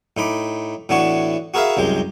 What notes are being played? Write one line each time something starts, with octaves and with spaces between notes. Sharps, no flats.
A2 D#4 B5 D6
A2 E3 B3 D4 F#4 C#6
F#4 G#4 A#4 B4 E5 F5
C2 F#2 G#3 G4